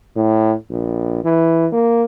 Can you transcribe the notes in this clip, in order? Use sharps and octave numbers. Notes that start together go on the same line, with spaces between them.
A2
A#1
E3
A#3